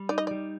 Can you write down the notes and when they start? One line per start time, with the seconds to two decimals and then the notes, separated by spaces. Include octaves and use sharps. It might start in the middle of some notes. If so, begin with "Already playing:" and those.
Already playing: G3
0.09 D#4 D5
0.18 D#5
0.27 G3 D5